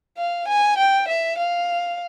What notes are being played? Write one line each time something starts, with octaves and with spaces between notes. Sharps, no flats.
F5
G#5
G5
E5
F5